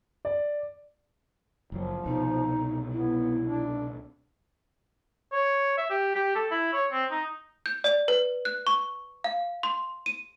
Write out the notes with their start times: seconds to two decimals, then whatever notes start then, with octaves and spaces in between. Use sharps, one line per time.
0.25 D5
1.72 F#1 F3 F#3
2.06 C2 B2 D#4
2.92 B3 E4
3.46 D4
5.32 C#5
5.77 E5
5.90 G4
6.15 G4
6.35 A4
6.51 E4
6.73 C#5
6.92 C4
7.11 D#4
7.66 G6
7.84 D5
8.08 B4
8.45 F#6
8.67 C#6
9.24 F5
9.63 C6
10.06 D#7